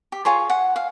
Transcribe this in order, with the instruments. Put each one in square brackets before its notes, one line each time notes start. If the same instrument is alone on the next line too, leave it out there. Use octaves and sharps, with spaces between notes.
[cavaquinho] G4
F4 G#4 C#5 C6
F#5
F5